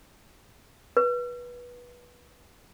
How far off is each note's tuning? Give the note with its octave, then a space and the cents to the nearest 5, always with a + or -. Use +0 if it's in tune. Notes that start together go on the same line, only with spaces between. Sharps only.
B4 -20